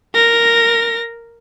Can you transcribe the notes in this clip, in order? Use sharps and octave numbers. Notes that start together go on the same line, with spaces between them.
A#4 A#6